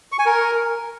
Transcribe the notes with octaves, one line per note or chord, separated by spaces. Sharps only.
C#6
G#5
A#4